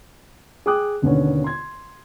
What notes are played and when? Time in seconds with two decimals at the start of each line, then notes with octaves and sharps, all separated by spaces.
0.66 G#4 G5 D6 D#6 F#6
1.02 D#2 B2 D3 D#3 B3 C#4
1.44 C6 G#6